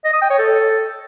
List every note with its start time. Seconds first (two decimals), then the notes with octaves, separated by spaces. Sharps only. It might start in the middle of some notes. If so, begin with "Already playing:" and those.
0.05 D#5
0.13 D#6
0.22 G5
0.30 C#5
0.38 A4